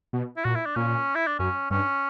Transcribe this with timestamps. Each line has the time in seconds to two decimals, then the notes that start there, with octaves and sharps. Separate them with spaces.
0.13 B2
0.37 E4
0.45 A#2 F#4
0.55 E4
0.66 D4
0.76 A#2 C#4
1.15 E4
1.27 D4
1.39 F#2 C#4
1.70 G2 C#4